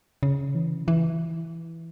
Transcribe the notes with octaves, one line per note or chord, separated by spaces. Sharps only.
C#3
E3
E3